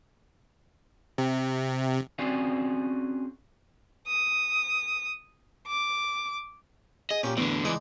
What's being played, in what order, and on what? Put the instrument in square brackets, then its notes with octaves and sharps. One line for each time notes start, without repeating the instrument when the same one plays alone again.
[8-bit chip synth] C3
[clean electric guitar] C4 C#4 F#4 G#4 D5 F5
[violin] D#6
D6
[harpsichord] G#4 [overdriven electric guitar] D#5
[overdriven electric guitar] A#2 [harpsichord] C#4 G4
[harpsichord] E2 [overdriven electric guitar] A2 D3
[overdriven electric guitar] C#2 E3 [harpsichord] G#3 D4 D#4